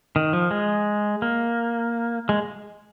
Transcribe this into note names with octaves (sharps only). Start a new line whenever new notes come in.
D#3
F3
G#3
A#3
G#3